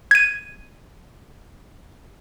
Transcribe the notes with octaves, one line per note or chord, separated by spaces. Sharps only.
G#6 D#7